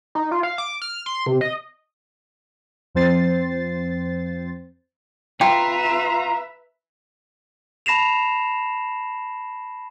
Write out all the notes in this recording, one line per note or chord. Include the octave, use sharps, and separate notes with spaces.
D#4
F4
F5
D6
F6
C6
C3
D#5
F2 F3 C4 C5 A6 C7
F4 B4 E5 G5 A#5
A5 B5 A#6 C7 E7 F7